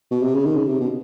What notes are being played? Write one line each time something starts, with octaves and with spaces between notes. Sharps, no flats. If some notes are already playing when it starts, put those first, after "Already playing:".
B2
C3
C#3
D#3
C#3
C3
B2